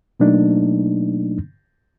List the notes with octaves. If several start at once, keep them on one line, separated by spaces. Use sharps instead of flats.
B2 F#3 A3 A#3 D4 D#4